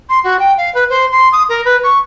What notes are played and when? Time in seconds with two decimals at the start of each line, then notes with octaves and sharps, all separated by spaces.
0.09 C6
0.23 F#4
0.39 G5
0.57 F5
0.74 B4
0.89 C5
1.11 C6
1.32 D#6
1.49 A#4
1.65 B4
1.83 C#6